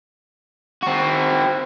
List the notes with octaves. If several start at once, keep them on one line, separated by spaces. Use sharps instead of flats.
C4 F#4